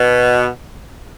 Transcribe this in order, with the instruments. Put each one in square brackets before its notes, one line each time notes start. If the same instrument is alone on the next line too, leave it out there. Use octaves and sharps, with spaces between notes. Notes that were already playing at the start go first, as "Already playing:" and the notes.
Already playing: [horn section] B2